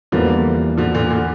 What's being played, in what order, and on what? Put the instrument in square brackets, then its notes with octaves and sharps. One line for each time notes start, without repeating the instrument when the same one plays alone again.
[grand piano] E2 E3 G3 A#3 [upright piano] D3 F3
[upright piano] D3 F3
A#2 D3
A#2 D3